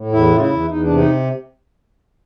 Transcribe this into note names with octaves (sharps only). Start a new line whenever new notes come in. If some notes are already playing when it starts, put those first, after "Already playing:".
Already playing: A2
E2 E4
C#3 F4
E4
E2
E2 D#4
D4
C3
D#4